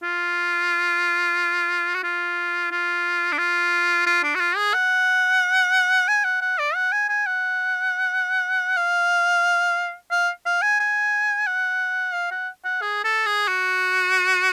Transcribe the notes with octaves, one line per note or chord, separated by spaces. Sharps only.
F4
F#4
F4
F4
D4
F4
F4
D4
F#4
F4
G#4
F#5
G#5
F#5
F#5
D5
F#5
G#5
G#5
F#5
F5
F5
F5
G#5
G#5
F#5
F5
F#5
F#5
G#4
A4
G#4
F#4